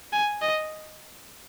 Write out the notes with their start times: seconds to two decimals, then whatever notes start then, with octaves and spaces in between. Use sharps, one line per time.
0.13 G#5
0.42 D#5